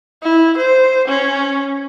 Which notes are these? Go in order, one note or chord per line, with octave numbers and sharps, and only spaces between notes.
E4
C5
C#4